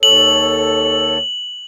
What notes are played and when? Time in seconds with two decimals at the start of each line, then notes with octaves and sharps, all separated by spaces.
0.03 D#2 A4 C#5 F#7